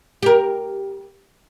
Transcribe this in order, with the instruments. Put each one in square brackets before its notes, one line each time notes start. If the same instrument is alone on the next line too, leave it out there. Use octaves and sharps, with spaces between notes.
[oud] G4 A#4